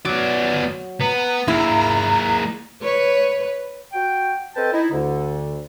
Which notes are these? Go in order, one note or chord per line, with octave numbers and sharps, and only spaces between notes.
F#3 B3 D5
B3 A#5
A#3 E4 G#4
B4 C#5
F#4 G5
C4 A4 B4 D#5 G5 A5
D#4 E4
D2 D3